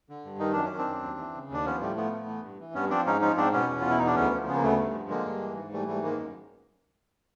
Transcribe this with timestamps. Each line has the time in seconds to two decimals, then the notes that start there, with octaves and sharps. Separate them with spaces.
0.09 D3
0.25 G2
0.40 D#3 D#4
0.53 F#2 D4
0.65 C#4
0.71 D#3
0.77 C4 D4
0.88 F#2
1.02 D#2
1.18 E3
1.34 C#3
1.50 D#2 D4
1.66 F3 B3 C#4
1.80 A2 G3 A3
1.96 F3 A3 B3
2.12 A2
2.28 E3
2.43 G2
2.60 E3
2.74 G2 B3 C#4
2.90 F3 C4 D4
3.06 G#2 C#4 D#4
3.21 F3 C#4 D#4
3.37 G#2 C4 D4
3.53 B2 B3 C#4
3.68 E2
3.81 F4
3.85 B2
3.90 E4
3.99 E2 D#4
4.07 D4
4.16 D2 B3 C#4
4.31 F3
4.47 C#3 B3
4.56 A#3
4.63 D2 A3 B3
4.79 G2
4.94 F3
5.10 D3 G#3 A#3
5.25 G2
5.42 E3
5.57 G#2
5.72 E3 G3 A3
5.87 G#2 G3 A3
6.04 D#3 G#3 A#3
6.19 F#2